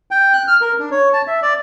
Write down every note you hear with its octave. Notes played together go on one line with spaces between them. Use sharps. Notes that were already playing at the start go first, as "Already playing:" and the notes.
G5
F#6
F6
A#4
D4
C#5
A5
E5
D5